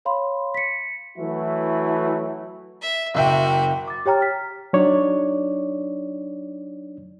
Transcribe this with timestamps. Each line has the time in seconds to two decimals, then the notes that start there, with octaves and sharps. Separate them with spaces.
0.05 C#5 F5 B5 C6
0.54 B6 C#7
1.18 E3 F#3 A3 E4 F#4
2.82 E5
3.15 F#1 A#3 F#4 E5 G5
3.88 D6 A6
4.06 G4 C#5 G5 A#5 F6 A6
4.21 F6 B6
4.73 F#3 D4 D#4 C#5 D5